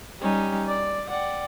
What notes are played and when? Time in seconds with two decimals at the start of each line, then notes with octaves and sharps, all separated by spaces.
0.21 G3 C#4 D#4 G4
0.69 D5
1.10 D5 F#5 G5